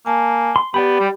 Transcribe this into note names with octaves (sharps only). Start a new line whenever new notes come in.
A#3 G#5 A5
C6
B3 G4 D5 G5 B5
G3